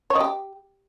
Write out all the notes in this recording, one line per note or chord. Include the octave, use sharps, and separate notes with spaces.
C#5
D#5
G4